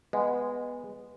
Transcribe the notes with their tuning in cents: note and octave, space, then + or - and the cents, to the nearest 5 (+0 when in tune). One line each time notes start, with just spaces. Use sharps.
G#3 -15 B3 -5